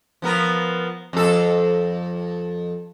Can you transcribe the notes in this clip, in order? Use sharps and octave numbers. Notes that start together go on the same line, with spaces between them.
F3 B3 A#4
F2 A4